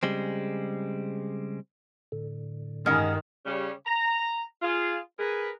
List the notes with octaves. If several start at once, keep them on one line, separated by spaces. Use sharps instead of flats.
C#3 G3 G#3 C4
A2 D3
G2 D#3 G#3 C#4 F#5 F6
C#3 G3 C#4
A#5
F4 G#4
G#4 A#4 B4